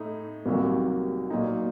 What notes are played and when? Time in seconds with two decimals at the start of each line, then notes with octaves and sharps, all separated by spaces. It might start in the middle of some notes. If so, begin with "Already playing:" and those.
Already playing: A2 A3 D#4
0.46 C2 C3 D#3 F#3 A#3
1.30 A#2 F#3 A#3 D#4